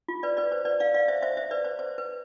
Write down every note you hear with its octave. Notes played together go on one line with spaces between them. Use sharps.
F4
B4 D5
B4 D5
C5
B4 D5
D5 F5
D5 F5
C5 E5
C5 E5
C5 E5
B4 D5
C5
C5
B4